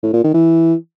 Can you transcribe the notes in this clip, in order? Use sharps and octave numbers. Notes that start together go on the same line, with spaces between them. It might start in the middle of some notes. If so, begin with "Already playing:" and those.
A2
A#2
D#3
E3